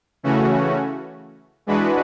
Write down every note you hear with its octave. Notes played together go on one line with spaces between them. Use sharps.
C#3 E3 A3 C#4 F#4
E3 G#3 D4 F#4 B4